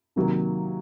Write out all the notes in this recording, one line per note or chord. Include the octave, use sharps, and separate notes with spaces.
C3 D#3 F#3 A#3